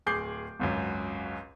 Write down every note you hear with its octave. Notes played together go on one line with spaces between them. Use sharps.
D1 G#4 D6 G6 C7
G#1 C#2 F#2